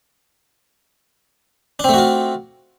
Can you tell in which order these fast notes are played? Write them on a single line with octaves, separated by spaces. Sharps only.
D4 C4 A3 F#4 F4